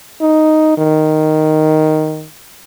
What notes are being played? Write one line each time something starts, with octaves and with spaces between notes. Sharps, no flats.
D#4
D#3